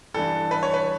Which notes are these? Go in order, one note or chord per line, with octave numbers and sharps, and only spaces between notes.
G2 E3 G3 A4
B4
C#5
B4